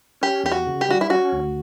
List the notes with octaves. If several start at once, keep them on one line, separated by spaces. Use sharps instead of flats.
C#4 G4
E2 G4
F#4
C#3
G4
G3 F#4
E4
C#4 F#4
D2